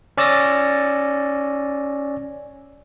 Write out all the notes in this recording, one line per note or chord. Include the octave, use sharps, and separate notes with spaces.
C#4 D5 E6 A6 A#6